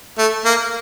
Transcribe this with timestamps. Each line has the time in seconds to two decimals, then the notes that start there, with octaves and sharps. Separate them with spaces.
0.18 A3
0.45 A#3